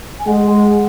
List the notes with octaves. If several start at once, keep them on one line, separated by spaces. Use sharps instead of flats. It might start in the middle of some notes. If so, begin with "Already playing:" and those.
G#5
G#3 F#5